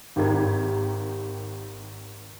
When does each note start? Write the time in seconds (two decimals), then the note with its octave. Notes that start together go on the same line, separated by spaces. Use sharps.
0.16 G#1 G4 A#4 G#6